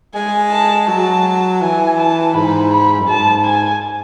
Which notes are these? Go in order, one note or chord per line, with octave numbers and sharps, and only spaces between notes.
G#3 G#5
A5
F#3 A5
E3 G#5
A5
G#2 B5
B5
F#2
G#2 A5
G#5